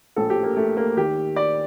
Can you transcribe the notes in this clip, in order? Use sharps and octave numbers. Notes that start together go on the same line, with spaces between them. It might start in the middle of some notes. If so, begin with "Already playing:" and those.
A#1 A2 F3 A4
G4
A#3
A3
A#3
D#2 D#3 G4
D5